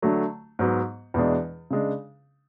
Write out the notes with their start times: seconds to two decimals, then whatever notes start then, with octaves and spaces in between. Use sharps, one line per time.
0.02 D3 F#3 A3
0.59 G#2 F#3 B3
1.14 E2 B2 G#3 D4
1.71 C#3 G#3 D4